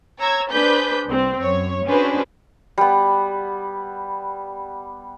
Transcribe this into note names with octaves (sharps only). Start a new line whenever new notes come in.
C#5 A#5 E6 G#6
D4 G#4 B4 C5 G6 B6
C2 C4
F#2 C#5
C#4 D4 F#4 G#4 B4 C5
G3 B3